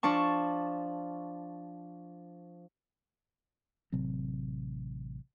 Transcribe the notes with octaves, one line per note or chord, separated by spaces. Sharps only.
F3 D4 A5 C#6
A1 C3 F#3 C4